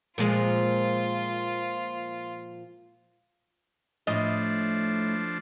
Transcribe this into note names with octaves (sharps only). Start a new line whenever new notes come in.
A#2 F3 G#3 F4
A2 F3 D4 D#5